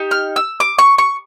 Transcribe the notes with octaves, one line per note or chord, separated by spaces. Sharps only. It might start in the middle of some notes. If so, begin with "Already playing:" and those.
Already playing: D#4 G4
F6
E6
D6
C#6
C#6